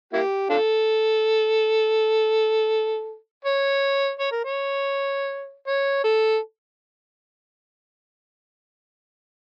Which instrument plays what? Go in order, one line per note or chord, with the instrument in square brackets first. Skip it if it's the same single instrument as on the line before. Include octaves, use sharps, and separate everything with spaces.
[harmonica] A#3 E4 G4
D4 F4 A4
C#5
C#5
A#4
C#5
C#5
A4